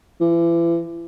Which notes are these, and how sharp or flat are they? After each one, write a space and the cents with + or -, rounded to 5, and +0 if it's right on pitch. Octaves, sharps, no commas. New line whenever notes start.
E3 +35